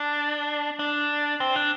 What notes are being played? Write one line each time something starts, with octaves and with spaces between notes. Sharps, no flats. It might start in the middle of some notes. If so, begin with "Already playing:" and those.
Already playing: D4
D4
C4
D4